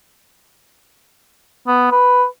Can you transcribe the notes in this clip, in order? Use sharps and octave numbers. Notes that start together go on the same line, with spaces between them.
B3
B4